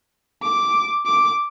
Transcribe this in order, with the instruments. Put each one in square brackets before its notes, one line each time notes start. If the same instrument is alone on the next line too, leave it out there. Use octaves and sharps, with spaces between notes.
[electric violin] D6
D6